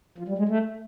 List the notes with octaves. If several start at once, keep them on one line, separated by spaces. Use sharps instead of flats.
F3
G3
G#3
A3